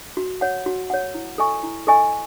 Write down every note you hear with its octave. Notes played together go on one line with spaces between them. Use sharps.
F#4
C#5 F#5
F#4
C#5 F#5
E4
A4 D#5 G#5 C#6
E4
A4 D#5 G#5 C#6